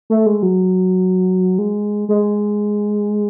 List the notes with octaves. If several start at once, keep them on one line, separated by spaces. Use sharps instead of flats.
A3
G#3
F#3
G#3
G#3